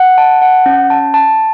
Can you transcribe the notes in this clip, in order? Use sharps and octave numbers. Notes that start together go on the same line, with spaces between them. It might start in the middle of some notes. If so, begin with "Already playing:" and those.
Already playing: F#5
A5
F#5
C#4
A5
A5